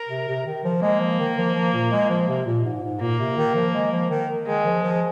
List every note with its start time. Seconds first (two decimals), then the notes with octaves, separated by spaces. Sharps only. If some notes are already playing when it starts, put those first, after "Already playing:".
Already playing: A#4
0.09 C3
0.28 C3
0.46 D#3
0.64 F3
0.82 G#3 A#3
1.00 F3
1.20 D#3
1.38 F3
1.55 F3
1.73 A#2
1.92 G#3
2.10 F3
2.28 C3
2.46 A#2
2.65 G#2
2.83 G#2
3.01 A#2 A#3
3.19 C3
3.37 D#3
3.56 F3
3.74 G#3
3.92 F3
4.10 D#3
4.47 D#3 G#3
4.66 F3
4.83 F3